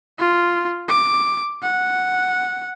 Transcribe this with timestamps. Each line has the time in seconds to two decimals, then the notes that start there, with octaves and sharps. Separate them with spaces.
0.19 F4
0.89 D6
1.63 F#5